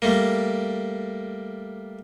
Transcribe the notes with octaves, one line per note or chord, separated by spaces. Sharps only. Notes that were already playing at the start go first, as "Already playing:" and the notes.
G3 A3 A#3